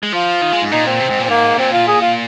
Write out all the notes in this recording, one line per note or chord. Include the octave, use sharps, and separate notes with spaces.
G#3
F3 F4
D#3
G#3
G#2
A#2 D#4
C4
C3
G#2
A#2
C4
G#2 A#3
A#2 C4
F4
G#4
F4